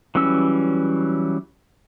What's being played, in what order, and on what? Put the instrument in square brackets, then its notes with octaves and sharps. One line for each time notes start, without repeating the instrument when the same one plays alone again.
[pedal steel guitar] E3 F#3 G3 C#4 E6